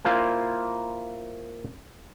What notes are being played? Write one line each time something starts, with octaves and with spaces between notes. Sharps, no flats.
A#3 E4 F4 C5 G#5